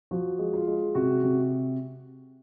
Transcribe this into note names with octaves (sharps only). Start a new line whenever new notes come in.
F3 F#4
G#3
F4
G#3
C3 F#4
C3